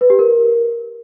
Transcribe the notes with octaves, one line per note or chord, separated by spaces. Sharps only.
B4
G4
A#4